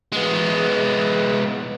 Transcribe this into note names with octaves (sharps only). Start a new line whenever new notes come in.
G#3 B3